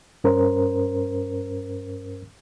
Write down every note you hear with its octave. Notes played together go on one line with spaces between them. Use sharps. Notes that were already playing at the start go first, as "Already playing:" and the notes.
G2 C#4 A#4 C5